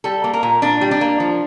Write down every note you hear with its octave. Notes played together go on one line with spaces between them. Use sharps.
G3 A4
A#3
A#4
A#2
A#2 D4
G3
D4
A#3
F3